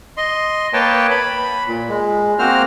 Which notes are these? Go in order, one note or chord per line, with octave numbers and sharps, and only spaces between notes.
D#5 C6
A#3 B4 C#5 G5 A5
B5
A#2
G#3
A#3 C4 F#4 C5 F6